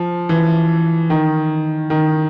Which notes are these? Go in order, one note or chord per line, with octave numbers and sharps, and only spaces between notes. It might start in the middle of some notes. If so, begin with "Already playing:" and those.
Already playing: F3
E3
D#3
D#3